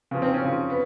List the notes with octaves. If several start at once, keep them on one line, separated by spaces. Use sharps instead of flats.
C#3 F3
C4
C#4
C#3 F3
B3